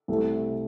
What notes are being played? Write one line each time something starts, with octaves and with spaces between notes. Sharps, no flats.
C2 C3 A3